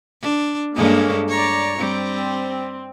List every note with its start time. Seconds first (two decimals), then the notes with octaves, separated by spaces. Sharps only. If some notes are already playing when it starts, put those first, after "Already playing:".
0.22 D4
0.76 G2 G#3 A#3 C#4 A4
1.29 C#5 D5 A#5
1.79 G3 C4